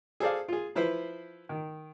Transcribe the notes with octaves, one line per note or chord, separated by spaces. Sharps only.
G#4 A4 C5 D5 F5
F4 G#4
F3 E4 B4 C5
D#3